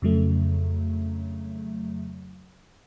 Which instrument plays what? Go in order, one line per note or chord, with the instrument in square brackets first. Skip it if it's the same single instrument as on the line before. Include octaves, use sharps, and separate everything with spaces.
[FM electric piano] F2 C#3 F#3 A3